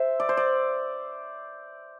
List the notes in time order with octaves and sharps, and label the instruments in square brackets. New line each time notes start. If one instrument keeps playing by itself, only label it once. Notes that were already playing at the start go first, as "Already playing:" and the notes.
Already playing: [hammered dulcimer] C5 E5
D5
C5
D5